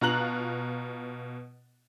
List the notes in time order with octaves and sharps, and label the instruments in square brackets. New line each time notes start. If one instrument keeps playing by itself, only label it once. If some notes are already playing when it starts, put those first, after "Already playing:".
[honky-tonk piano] B2 F4 A#5 F#6 F#7